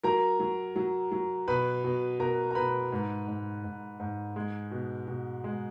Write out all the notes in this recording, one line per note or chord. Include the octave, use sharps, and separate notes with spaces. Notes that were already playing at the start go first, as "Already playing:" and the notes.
F#3 A#4 A#5
F#3
F#3
F#3
B2 B4 B5
B2
B2 A#4 A#5
A#5
B2 B4 B5
G#2
G#2
G#2
G#2
G#3
B2
B2
G#3